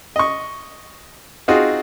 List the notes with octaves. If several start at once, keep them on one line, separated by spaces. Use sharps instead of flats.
D#5 C#6
C4 D#4 F4 F#4 G#4